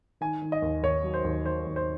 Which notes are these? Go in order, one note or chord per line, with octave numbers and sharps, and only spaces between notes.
D#3 G#5
D#3
D#5
D#2
D#2 C#5
F#3
C5
D#2
D#3 C5
D#2
C5